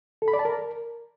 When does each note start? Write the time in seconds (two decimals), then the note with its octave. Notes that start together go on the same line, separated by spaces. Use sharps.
0.22 A4
0.28 B5
0.33 D5
0.39 A5
0.45 A#4